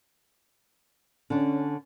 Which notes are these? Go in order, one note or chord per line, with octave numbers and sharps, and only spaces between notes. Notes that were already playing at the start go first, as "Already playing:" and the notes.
D3 C#4 D4